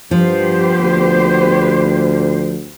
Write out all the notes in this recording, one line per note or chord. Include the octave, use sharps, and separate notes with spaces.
G2 F3 B3 G4 C5
D2